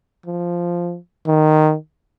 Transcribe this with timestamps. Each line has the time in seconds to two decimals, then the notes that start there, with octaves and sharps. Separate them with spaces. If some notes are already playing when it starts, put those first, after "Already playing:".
0.26 F3
1.27 D#3